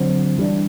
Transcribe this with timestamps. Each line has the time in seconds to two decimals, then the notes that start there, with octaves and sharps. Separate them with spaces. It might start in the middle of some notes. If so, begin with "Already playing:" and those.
Already playing: D3 F#3 C4
0.38 E3 G3 D4